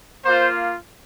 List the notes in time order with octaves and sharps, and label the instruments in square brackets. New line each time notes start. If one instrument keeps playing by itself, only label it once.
[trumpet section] A#3 F4 C5